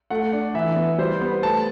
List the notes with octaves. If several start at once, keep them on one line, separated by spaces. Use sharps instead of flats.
A3 F#5
D4
E3 E5
B3
G3 C5
B3
A3 A5